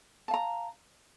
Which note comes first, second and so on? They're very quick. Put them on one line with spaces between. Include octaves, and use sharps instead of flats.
A5 F5 A#5